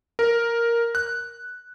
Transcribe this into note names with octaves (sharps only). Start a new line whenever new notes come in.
A#4
F#6